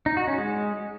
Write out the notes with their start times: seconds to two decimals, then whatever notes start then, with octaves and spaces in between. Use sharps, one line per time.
0.06 D#4
0.17 F#4
0.27 C#4
0.38 G#3